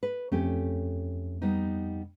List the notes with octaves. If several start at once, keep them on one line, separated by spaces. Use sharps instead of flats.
B4
F2 A3 C#4 G4
G3 B3 D#4